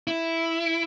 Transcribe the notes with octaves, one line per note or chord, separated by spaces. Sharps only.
E4